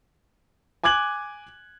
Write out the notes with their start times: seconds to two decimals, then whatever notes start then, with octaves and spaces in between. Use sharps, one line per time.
0.84 G#5 D6 F#6 G#6 F#7